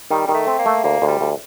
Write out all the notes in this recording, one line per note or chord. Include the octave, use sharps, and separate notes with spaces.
D#3 G3
D#3 G3
A3
C4
A#3
A3
D2 A#3
D2
G3
D2